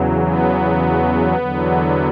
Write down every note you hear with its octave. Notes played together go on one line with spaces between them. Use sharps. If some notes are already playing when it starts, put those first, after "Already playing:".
Already playing: E2 C#3 F#3
B3
E2 D3 F#3